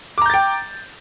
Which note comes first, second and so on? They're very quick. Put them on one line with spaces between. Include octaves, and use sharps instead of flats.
D6 A#5 G6 A6 G5